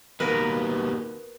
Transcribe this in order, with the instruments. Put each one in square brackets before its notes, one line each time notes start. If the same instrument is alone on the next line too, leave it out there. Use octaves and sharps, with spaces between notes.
[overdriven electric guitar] D#2 B2 [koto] A#4 B4